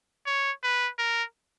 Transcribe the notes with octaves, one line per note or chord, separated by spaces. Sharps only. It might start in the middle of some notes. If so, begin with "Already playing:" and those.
C#5
B4
A#4